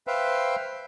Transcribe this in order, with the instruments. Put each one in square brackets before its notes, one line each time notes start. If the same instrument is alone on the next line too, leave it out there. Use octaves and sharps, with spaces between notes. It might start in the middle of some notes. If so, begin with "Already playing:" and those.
[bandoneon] B4 C5 E5 F5 G5